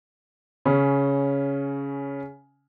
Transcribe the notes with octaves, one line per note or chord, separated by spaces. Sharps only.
C#3 C#4